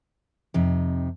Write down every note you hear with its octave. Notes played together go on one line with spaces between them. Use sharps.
F2 C3 D#4